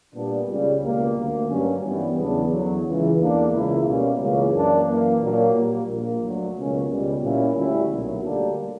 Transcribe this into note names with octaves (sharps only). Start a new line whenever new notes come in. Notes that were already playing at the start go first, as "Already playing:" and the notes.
A#2 G3 B3 D4
C#2 C#3 G3
C#2 B2 G3 A#3
D2 D3 A#3
G2 F#3 A#3 C#4
G2 E3 G3 B3
E2 C#3 F#3 B3 D4
E2 D3 F#3
C#2 C#3 E3
E2 D3 A#3 D4
C#2 C#3 E3 A#3 E4
B2 G3 A#3 C#4
C#2 C#3 E3 A#3 C#4
F#2 E3 A#3 D4
F#2 E3 A#3
A#2 F#3 A#3 D4
A#2 G3 A#3
A#1 A#2 A#3
D2 D3 F#3
C#2 B2 A#3 C#4
C#2 B2 G3
A#2 G3 A#3 C#4 E4
D2 D3 G3 C#4 E4
B1 A#2 F#3
D2 D3 G3 A#3 D4